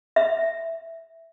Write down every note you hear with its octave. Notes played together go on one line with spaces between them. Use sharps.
E5